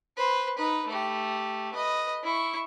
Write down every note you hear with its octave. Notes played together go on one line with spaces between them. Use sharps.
B4 C5
D#4 B4
A3 G4
B4 D#5
E4 C#6